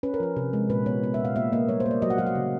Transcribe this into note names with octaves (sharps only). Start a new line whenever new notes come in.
C#4 B4
A#4
F3 B4
C3
G#3
A#2 B4
B3 C#5
B3
E5
A#2 F5
A#3 E5
A#3 D#5
G3 C#5
C5
A#3
D5
F#3 D#5
F#5
F#3 F5
F#5
C#3